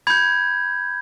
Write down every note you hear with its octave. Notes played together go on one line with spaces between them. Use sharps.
B5 G6 G#6